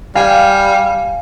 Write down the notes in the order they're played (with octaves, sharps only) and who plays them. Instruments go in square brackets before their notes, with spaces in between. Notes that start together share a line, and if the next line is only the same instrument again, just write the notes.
[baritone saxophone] G3 [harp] F5 G#5